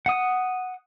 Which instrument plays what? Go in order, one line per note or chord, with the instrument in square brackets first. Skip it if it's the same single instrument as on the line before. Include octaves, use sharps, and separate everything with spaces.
[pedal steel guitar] F#5 D#6